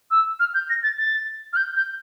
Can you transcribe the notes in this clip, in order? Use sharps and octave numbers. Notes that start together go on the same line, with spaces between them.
E6
F6
G6
A#6
A6
A6
F6
G6
G6